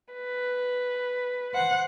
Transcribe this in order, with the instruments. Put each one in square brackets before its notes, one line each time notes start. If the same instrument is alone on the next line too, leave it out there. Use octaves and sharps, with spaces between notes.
[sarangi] B4
[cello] C5 F#5